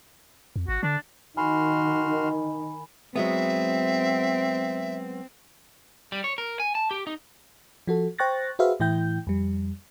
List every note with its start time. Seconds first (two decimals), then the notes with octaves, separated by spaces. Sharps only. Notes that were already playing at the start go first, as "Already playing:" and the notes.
0.56 F2
0.68 G#1 F#4
0.83 D3 D4
1.37 D#3 D#4 F#4 G#5 B5 C6 F6
3.16 F#3 G#3 B3 C4 E5
6.12 G3
6.24 C#5
6.38 A#4
6.60 G#5
6.75 A5
6.91 G4
7.07 D#4
7.87 F3 F#4 A4
8.19 C5 G5 C#6 F#6 A6 A#6
8.59 F#4 G#4 B4 C5 E5 F5
8.80 A2 E3 E4 G5 G6
9.27 F2 G3